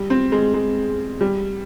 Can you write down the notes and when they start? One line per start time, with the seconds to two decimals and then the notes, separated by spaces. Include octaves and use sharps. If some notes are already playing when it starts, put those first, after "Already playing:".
Already playing: G3
0.10 C4
0.32 G#3
0.54 G#3
1.21 G3